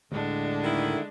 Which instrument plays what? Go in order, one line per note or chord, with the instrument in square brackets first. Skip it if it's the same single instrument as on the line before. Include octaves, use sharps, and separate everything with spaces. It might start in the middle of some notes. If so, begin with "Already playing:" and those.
[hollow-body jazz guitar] D2 A2 [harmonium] D3 [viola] G#3 D4
[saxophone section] D#3 A3 E4